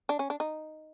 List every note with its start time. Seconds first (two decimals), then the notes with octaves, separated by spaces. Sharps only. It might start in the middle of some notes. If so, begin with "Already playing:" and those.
0.09 D4
0.19 C#4
0.30 D4
0.40 D#4